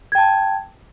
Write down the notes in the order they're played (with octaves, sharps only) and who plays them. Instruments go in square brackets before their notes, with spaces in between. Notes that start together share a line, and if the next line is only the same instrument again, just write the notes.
[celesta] G#6
G5
A5